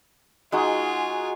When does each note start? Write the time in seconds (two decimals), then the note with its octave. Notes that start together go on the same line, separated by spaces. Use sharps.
0.52 G#3 D#4 F4 F#4 G#5